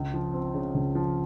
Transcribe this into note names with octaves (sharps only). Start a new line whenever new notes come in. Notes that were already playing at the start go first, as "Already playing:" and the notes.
Already playing: C#2
F3
C4
C#3
C#2
F3